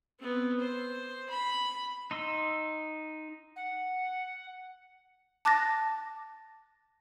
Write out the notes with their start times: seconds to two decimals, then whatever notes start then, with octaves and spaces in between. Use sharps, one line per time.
0.19 B3 C4
0.59 C5
1.29 B5
2.11 D#4 C6 E6
3.56 F#5
5.45 A5 D6 F#6 A6 A#6